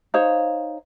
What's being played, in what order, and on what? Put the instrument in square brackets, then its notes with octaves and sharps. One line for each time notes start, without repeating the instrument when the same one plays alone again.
[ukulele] D#4 C5 C#5 F5